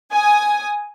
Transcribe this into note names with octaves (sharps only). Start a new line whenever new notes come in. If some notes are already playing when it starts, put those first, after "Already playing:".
G#5 D#6